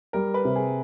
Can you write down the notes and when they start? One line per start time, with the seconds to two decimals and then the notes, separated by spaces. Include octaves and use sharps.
0.13 G3 A#4
0.34 B4
0.45 C3
0.56 G#4